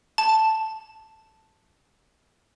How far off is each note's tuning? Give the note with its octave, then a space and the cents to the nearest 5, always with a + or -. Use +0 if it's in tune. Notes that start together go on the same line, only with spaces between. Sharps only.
A5 +0